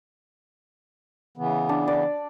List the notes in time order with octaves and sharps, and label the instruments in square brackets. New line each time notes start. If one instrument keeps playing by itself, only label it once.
[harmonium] C#3 E3 B3
[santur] D4
D5